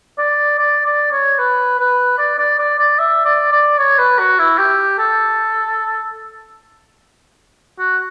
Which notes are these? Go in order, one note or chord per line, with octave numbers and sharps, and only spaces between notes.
D5
D5
D5
C#5
B4
B4
D5
D5
D5
D5
E5
D5
D5
C#5
B4
F#4
E4
G4
A4
F#4